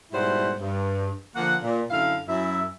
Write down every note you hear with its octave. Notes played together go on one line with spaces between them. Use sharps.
G#2 B2 G3 E4 C5 F#5
G2
D3 F3 A#3 F#5
A#2
F#2 D3 E4 F5
F#2 E4 E5